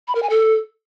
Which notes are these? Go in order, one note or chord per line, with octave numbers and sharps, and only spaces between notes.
B5
A#4
G#5
A4